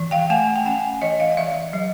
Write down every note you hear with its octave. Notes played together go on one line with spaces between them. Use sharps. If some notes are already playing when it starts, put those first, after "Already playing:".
Already playing: E3
F5 G5
A3 F#5 G#5
G5
C#4 F#5 G#5
E3 C#5 D#5
D#5 F5
F5
E3 D5 E5
F#3